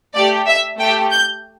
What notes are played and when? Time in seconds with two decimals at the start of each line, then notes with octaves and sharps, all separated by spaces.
0.14 A3 G4 D5
0.47 E5
0.79 A3 G4 G5
1.11 G6